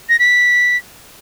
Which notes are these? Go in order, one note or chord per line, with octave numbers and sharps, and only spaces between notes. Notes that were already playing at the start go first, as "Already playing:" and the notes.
A#6
B6